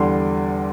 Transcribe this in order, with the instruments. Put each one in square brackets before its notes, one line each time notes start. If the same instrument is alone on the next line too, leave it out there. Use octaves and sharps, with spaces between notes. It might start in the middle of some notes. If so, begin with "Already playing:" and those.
Already playing: [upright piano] E2 D3 G3 C6